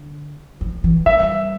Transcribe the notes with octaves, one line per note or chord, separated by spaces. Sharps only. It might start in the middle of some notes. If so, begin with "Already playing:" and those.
Already playing: D3
F3
E3
G3 E5